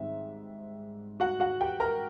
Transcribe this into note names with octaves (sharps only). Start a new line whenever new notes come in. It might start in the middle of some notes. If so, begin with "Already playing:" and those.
Already playing: G#2 D#3 G3 C4 E5
F#4 F#5
F#4 F#5
G4 G5
A#4 A#5